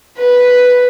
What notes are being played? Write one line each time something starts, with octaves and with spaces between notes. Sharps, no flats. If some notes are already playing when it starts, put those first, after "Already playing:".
B4